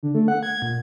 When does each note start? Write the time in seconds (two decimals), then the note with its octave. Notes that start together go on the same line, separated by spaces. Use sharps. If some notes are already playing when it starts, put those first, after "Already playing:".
0.03 D3
0.15 A3
0.28 F#5
0.43 G#6
0.62 A#2